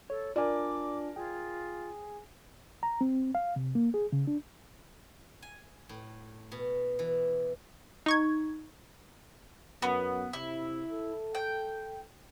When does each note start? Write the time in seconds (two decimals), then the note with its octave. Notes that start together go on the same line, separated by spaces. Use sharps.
0.10 A4 C#5
0.36 D4 F4 A#4 D5 G#5 D6
1.16 F4 G#4 G5
2.83 A#5
3.01 C4
3.35 F5
3.56 C3
3.75 A#3
3.94 G#4
4.12 C#3
4.27 D4
5.42 G#5
5.89 A2
6.52 B2
6.99 E3
8.06 D#4 C#6 G#6
9.82 F#2 B3
10.33 C3 E4
10.91 A4
11.35 G5